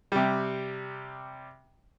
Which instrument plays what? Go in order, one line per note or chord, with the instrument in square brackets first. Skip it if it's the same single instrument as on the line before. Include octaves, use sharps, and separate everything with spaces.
[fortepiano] C3 G3